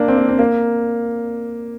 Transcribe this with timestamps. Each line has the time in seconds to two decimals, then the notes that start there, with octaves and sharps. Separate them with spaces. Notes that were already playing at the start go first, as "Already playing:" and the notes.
Already playing: A#3 D4
0.08 C4
0.18 A#3
0.29 C4
0.39 A#3